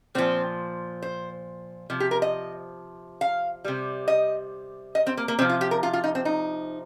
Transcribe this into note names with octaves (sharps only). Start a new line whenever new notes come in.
A#2 F3 C4
C5
C3 F3
G4
A#4
D#5
F5
C3 G3
D#5
D#5
C4
A#3
A#3
C3 F3 C4
F4
G4
A#4
F4
F4
D#4
C4
D#4